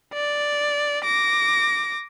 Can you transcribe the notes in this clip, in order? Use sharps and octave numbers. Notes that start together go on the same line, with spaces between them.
D5
D6 A#6